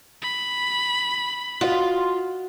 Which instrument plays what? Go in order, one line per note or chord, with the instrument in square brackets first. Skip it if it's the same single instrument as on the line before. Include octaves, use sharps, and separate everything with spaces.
[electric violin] B5
[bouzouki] F4 [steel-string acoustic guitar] F#4 D#5